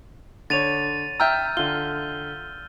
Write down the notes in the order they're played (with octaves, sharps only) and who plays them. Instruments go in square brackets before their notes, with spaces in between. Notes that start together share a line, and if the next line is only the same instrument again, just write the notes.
[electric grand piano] D3 C#5 [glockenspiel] A6 D#7 F7
[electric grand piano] E5 G5 A#5 [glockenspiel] E6 F6 G6
[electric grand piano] D3 F4 [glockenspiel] G7